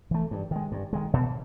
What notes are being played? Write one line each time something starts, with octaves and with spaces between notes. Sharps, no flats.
E3 A3
G2
D#3 G#3
G2
D#3 G#3
B2